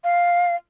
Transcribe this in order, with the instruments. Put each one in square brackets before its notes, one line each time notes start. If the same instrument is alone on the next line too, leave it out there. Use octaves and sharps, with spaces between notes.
[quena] F5